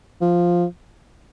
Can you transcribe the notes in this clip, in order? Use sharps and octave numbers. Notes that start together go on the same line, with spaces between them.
F3